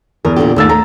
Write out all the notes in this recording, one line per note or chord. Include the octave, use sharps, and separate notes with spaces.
E2 A#4
A#2 D3 G4
D#2 G#2 A3 E6 A6
A3 A#5